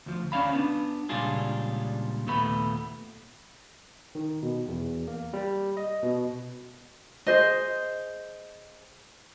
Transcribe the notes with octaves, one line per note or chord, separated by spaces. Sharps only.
D2 F3
C#4 D5 F5 B5
B3 D4
C#2 A#2 G3 D4 F4 G#4
D#2 A#2 A3 B3 B5
D#3
B2
E2
A#3
G3
D#5
B2
G#4 C5 D#5